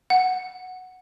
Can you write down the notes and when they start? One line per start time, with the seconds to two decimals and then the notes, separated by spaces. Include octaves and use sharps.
0.10 F#5